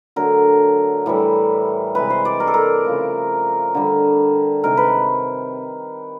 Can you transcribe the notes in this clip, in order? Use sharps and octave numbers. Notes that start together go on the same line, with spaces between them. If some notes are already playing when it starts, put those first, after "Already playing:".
D3 F#3 A3 A#4
A2 E3 G3
C3 E3 G#3 B4
C5
D5
A#4
A4
A#4
C#3 F3 A3
D3 G3
C3 D#3 G#3 A#4
B4